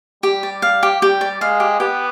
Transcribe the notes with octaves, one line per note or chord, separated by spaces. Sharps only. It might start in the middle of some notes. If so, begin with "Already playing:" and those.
G3 G4
D5
F5
G4
G3 G4
D5
G#3 F5
G4
B3 G4